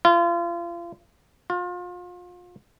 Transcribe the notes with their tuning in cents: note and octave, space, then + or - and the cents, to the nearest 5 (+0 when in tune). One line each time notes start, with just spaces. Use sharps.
F4 -35
F4 +30